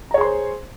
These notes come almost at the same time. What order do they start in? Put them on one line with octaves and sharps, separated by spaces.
A#5 C#5 G#4 C6 C5